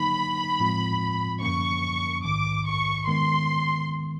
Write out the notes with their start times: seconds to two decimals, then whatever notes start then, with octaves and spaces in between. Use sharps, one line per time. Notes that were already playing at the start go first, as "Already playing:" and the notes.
Already playing: D3 F#3 A#3 D#4 B5
0.60 A2 F3 G#3 C4 F4
1.42 F#2 D3 F3 A#3 C#4 C#6
2.25 A#1 G#2 D#3 D6
2.67 C#6
3.08 D#3 G#3 B3 C6